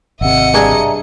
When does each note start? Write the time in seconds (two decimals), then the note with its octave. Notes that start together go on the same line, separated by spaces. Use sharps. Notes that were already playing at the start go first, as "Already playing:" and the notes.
0.21 G#1 C3 D#5 E5 F#5 E6 C#7
0.54 G2 D4 G#4 D5 E5 A#5